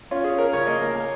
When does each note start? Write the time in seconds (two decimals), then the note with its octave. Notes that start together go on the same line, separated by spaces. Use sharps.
0.11 C#4 F4
0.24 C#4 G#4
0.38 C#4 A#4
0.53 C#3 C#5
0.67 A#3 D#5
0.82 A#3
0.95 A#3